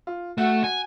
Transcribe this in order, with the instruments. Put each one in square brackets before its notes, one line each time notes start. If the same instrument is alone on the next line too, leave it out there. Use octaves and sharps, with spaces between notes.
[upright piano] F4
[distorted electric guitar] A3 [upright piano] F#4 F#5
[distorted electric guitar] G#5